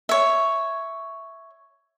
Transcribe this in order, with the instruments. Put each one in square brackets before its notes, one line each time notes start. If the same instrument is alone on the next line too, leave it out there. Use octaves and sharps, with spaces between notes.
[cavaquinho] C#5 E5